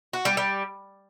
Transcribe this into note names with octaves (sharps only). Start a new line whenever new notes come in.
F#4
G3
G3